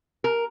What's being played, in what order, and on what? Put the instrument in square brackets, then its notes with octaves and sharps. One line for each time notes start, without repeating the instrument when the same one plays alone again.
[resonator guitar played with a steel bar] A#4